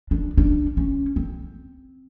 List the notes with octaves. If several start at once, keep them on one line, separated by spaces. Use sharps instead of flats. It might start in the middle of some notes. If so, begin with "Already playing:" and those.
D4
D4
C#4
C4